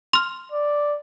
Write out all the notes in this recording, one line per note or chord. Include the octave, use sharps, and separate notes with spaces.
C6 F6
D5